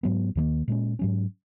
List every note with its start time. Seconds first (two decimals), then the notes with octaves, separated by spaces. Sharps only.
0.03 G#2 F#3 B3
0.35 D#2 D#3 F#3 A#3
0.68 A#2 G#3 C#4
0.99 G#2 F#3 C#4